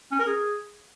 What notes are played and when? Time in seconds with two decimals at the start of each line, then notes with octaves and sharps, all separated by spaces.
0.12 C#4
0.19 A#4
0.27 G#4